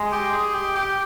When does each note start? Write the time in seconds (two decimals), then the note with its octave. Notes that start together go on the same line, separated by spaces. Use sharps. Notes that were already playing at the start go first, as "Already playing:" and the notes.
Already playing: G#3
0.12 G4
0.33 G#4
0.54 G4
0.76 G4